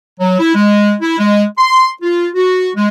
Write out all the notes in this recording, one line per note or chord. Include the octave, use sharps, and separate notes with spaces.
F#3
E4
G#3
E4
G#3
C6
F4
F#4
G#3